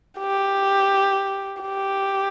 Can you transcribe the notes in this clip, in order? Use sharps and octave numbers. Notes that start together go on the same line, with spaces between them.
G4
G4